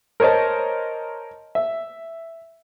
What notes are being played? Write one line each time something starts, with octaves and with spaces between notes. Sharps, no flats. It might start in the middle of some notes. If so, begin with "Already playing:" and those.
A#4 C5 C#5 D#5 A5
E5